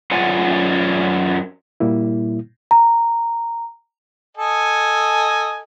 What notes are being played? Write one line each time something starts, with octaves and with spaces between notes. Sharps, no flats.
F#2 C#4 F4 D5 F#5 G#5
A#2 G3 A#3 E4
A#5
A4 D#5 G#5